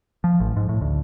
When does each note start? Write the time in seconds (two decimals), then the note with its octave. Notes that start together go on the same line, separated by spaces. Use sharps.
0.24 F3
0.40 A1
0.56 G#2
0.69 A2
0.81 D2